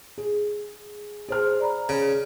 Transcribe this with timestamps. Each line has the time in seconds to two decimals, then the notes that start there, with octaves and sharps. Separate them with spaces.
0.18 G#4
1.29 G#4 C5 F6
1.60 D5 A#5 B5
1.89 C#3